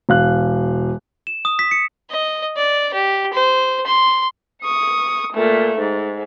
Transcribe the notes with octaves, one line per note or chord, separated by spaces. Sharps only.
E1 F5 F#6
E7
D#6
B6
C#7
D#5
D5
G4
C5
C6
C#6 D#6
A#2 A3
G#2